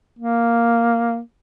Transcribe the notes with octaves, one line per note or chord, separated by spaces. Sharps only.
A#3